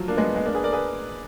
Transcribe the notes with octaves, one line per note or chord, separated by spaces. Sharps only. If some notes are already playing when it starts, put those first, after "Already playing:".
Already playing: F3 F#3
A#3 D4
G#3 B3
G#3 B3
A#3 D4
G#4 B4
A#4 D5
G#4 B4